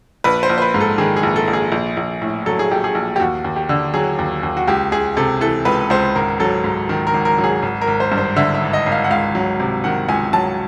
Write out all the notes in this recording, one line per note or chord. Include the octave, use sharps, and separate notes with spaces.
A#1 B4
C5
A#1
C5
B4
G#2
A4
D#3 G#4
G#4
A#1
A4
A#1
G#4
A#1
A#1
A2
F#3 A4
G#4
A#1 G4
G#4
A#1
G4
D#2 F#4
D#2
G4
D3
F#3 G#4
D#2
D#2
F#4
C#2 G4
C#2 G#4
C3 A4
E3 A4
C#2 B4
C#2 C5
G#1 A#4
F#3 A4
G#2
D#3
A#4
G#1
A#4
F#3
G#4
G#1
A#4
G#1
C5
G2
C5
D3 E5
E5
G#1
D#5
G#1
F5
F#5
C#2 F5
F#3
C3
D#3 F#5
C#2 G#5
F#3 A5